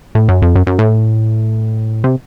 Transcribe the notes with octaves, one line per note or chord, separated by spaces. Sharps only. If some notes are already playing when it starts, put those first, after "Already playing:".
A2
F#2
F2
F#2
F#2
A2
C3